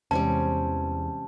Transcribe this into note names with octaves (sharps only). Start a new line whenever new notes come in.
E2 C3 E3 G3 G#3 C4 C#4 A5